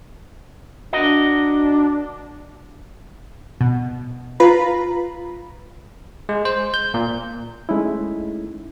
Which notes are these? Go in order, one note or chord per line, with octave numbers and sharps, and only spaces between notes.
D4 F#4 A#4 D#5
B2
F4 B4 A#5 B5
G#3
C5
G6
A#2
G#3 A3 C#4 D#4 E4